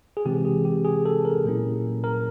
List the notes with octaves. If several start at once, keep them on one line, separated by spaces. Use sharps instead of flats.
G#4
C3 E3 G#3 C4 G4
G#4
G4
G#4
A4
A#4
A#2 F#3 A#3 C#4 E4
A#4